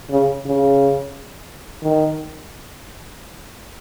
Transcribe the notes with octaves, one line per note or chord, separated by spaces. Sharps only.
C#3
C#3
D#3